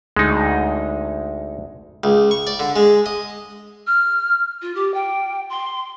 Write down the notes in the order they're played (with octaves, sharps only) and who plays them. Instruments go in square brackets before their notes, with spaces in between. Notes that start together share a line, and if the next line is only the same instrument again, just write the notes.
[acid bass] D2 [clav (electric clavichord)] G#3 D#4
[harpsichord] C#2
C#6
D5
D3
G#3
D#5
[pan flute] F6
F4
G4
G5
C6